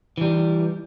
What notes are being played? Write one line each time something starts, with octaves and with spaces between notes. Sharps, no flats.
E3 G3